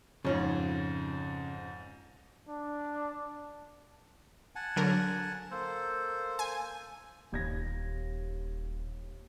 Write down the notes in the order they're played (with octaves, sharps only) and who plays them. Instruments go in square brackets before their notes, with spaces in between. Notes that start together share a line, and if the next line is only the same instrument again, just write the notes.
[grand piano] F2 G#2 [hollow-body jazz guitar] C#3 C#4 F4
[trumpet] D4
[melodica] F#5 G#5 A5
[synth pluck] D3 F#3 A#4
[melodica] A#3 A4 C5
[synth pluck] G#5
[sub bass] D#1 [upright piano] D#2 G#6 A#6